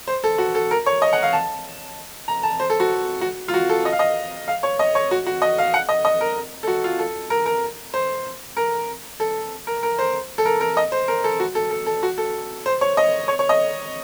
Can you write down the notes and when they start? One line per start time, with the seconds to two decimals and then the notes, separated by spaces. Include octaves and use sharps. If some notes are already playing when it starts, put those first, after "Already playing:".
0.07 C5
0.24 A4
0.38 F#4
0.55 A4
0.71 A#4
0.86 C#5
1.02 D#5
1.13 F#5
1.23 F5
1.33 A5
2.28 A#5
2.43 A5
2.60 C5
2.70 A4
2.80 F#4
3.21 F#4
3.48 F4
3.54 F#4
3.69 A4
3.85 D#5
3.92 F5
3.99 D#5
4.48 F5
4.63 C#5
4.79 D#5
4.95 C#5
5.11 F#4
5.26 F#4
5.42 D#5
5.58 F5
5.74 F#5
5.89 D#5
6.05 D#5
6.21 A#4
6.63 A4
6.67 F#4
6.84 F4
6.99 A4
7.30 A#4
7.46 A#4
7.94 C5
8.57 A#4
9.20 A4
9.67 A#4
9.83 A#4
9.99 C5
10.38 A4
10.45 A#4
10.61 A#4
10.77 D#5
10.92 C5
11.08 A#4
11.24 A4
11.40 F#4
11.55 A4
11.71 A4
11.86 A4
12.03 F#4
12.18 A4
12.66 C5
12.81 C#5
12.97 D#5
13.28 C#5
13.39 C#5
13.49 D#5